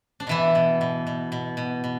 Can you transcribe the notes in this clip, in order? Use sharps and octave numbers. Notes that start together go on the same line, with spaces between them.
D4
B2 E3 E4
B2
B2
B2
B2
B2
B2